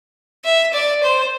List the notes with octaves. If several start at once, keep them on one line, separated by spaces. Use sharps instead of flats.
E5
D5
C5